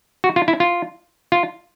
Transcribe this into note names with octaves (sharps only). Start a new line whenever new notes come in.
F#4
F4
E4
F4
F4